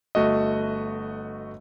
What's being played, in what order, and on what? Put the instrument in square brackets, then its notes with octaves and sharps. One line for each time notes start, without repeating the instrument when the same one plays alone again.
[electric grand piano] G1 A3 F#4 D#5